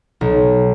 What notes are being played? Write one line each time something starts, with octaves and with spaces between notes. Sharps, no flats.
B1